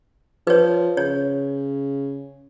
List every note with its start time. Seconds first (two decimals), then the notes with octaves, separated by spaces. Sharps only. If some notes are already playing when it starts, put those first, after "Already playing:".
0.47 F3 B4 C#5
0.97 C#3 C#5